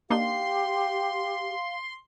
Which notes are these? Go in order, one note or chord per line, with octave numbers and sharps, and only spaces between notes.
A#3 D4 D#4 G4 F5 C6